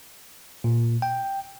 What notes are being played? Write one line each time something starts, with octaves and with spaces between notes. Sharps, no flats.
A#2
G5